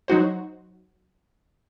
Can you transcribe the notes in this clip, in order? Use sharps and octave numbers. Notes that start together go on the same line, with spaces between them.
F#3 D#4 F#4 C5